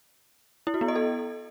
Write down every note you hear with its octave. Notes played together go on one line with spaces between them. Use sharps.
E4
F#4
B3
D#5
A4